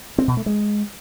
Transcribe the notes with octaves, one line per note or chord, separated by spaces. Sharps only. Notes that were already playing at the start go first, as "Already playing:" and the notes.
C4
B2
A3
G#3